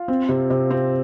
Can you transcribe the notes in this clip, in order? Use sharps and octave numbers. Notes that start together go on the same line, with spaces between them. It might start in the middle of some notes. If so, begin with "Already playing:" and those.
Already playing: F4
C4
C3
C3
C4